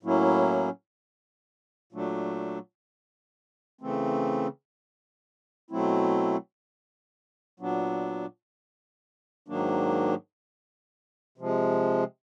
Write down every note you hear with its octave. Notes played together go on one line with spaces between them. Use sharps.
A2 F#3 A#3 C#4 E4
A#2 F#3 A3 D4
C#3 E3 A3 C4
B2 F#3 A3 C4 E4
A#2 F#3 B3 D4
G#2 D#3 F#3 A#3 D4
C3 F3 G#3